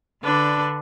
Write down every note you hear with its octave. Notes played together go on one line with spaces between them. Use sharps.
D3 D4 A4 B4